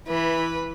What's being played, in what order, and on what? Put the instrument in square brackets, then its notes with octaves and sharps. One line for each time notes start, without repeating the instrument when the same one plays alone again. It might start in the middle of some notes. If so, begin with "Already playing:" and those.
[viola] E3 [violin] B4